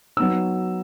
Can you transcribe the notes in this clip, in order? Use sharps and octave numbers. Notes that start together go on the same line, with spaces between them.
F#3 B3 D#4 E6